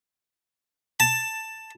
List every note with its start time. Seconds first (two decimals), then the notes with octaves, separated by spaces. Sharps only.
1.00 A5